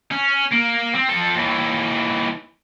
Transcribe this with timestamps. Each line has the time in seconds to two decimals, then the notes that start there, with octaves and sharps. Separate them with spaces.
0.11 C#4
0.51 A#3
0.94 C4
1.09 F3 A4
1.35 D#2 E3